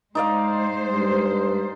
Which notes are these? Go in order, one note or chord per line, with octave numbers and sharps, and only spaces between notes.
G#3 D#4 C5 D5 F5
G2